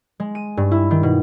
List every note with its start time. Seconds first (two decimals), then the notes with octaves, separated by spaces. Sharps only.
0.20 G#3
0.35 D#7
0.57 G2
0.71 E4
0.91 D#3
1.03 B2